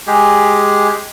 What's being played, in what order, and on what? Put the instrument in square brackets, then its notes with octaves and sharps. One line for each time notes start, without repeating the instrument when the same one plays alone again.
[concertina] G#3 G4 G#4